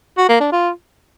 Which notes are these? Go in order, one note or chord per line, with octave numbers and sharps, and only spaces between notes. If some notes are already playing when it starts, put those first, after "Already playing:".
F#4
A#3
D4
F4